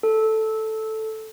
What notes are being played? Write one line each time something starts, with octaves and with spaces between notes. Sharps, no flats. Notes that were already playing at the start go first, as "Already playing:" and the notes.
A4